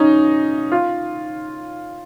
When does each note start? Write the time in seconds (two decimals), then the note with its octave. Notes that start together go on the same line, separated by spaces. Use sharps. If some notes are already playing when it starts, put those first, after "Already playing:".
Already playing: C#4 D#4
0.72 F4